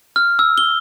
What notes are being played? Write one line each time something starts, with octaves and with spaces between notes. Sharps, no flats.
F6
E6
G7